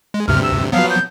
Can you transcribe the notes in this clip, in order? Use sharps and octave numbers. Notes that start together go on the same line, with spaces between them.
G#3
D2 G2 C3 F6
E6
F3 F#3 B3 F5
G6